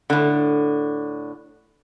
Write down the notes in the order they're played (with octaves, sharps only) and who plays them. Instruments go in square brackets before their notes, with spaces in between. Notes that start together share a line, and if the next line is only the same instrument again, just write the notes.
[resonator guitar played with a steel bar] A2 D3